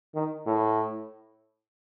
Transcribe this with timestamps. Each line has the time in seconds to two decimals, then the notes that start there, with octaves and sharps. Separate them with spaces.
0.15 D#3
0.47 A2